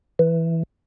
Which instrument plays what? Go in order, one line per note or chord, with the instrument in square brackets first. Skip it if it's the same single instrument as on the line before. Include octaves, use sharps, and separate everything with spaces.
[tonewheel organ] E3